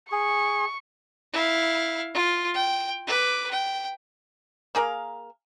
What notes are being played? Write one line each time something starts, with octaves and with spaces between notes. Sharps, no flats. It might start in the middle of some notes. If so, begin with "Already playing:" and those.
G#4 C#6
E4 F5
F4
G5
B4 D6
G5
A#3 G#4 A#4 F5